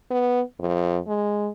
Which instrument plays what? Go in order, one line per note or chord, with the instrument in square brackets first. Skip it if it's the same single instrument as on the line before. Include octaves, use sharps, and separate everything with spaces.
[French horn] B3
F2
G#3